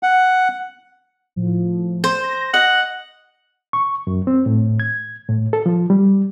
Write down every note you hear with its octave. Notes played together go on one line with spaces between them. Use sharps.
F#5
A2 F3
C5
A#6
D#5 F#5
C#6
F#2
C4
A2
G#6
A2
A4
F3
G3